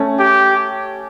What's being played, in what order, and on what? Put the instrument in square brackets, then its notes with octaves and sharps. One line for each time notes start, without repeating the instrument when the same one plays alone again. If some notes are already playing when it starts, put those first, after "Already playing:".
Already playing: [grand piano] A3 C#4
[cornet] G4